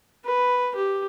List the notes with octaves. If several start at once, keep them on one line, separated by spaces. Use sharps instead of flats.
B4
G4